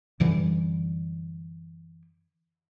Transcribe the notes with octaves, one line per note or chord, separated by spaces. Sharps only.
F#2 D3 E3 G3